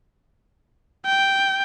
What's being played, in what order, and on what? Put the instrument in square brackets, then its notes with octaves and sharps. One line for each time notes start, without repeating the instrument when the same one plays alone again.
[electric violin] G5